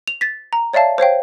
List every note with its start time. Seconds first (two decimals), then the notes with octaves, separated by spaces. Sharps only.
0.08 F7
0.21 A6 B6
0.53 A#5
0.73 C#5 D5 E5 F5 A5
0.98 C5 C#5 F5 G5